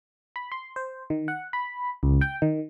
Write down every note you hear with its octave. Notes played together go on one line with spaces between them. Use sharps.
B5
C6
C5
D#3
F#5
B5
C#2
G5
D#3